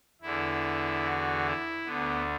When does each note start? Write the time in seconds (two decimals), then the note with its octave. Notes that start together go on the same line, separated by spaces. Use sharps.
0.22 E2 D3 E4
1.04 F#4
1.45 E4
1.86 D2 D3 B3